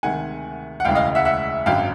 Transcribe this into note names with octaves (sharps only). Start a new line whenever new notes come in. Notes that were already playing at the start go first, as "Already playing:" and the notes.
D2 C3 D#3 G#3 F#5 G#5
F#5
E1 D2 C#3 E3 G#3 F5 G5
D#5 F5
E5 F#5
E5 F#5
G#1 F#2 D3 F#3 F5 G5